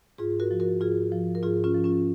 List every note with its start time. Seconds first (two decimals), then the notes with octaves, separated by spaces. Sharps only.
0.18 G#2 F4 G#4
0.40 F#4 A#4
0.51 F3
0.60 F#4 A#4
0.81 G#2 F4 G#4
1.12 F3
1.35 A#4
1.43 G#2 F4 G#4
1.64 C#4 F4
1.74 F3
1.84 C#4 F4